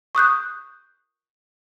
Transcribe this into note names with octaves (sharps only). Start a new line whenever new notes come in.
C#6 D#6 F#6 G6